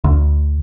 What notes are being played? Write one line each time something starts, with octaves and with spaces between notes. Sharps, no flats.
D2